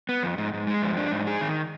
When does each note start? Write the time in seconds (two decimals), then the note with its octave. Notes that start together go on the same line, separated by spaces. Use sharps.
0.09 B3
0.23 F2
0.38 G#2
0.53 G#2
0.67 G#3
0.82 F2
0.97 D4
1.12 G#2
1.27 G#4
1.41 D#3